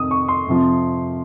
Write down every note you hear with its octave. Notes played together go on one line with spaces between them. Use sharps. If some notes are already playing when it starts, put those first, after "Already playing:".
Already playing: F2 C3 D#3 D#6
C#6
C6
F2 C3 F3